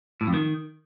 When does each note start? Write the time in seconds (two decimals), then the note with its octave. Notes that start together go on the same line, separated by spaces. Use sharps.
0.21 A2
0.27 F2
0.34 D#3